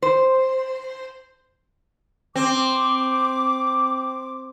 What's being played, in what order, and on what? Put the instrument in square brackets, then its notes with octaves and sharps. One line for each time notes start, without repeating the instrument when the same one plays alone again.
[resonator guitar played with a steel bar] C5
[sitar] C4 [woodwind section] D6